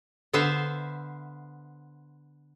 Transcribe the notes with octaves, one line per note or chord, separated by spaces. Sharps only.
D3 B3 C5 E5 F5